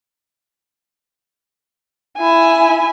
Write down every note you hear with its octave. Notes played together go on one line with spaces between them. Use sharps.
E4 G#5